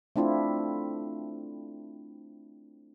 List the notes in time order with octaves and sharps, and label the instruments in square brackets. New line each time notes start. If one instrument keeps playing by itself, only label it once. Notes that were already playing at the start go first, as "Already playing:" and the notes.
[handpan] A3 C4 D4 E4 F4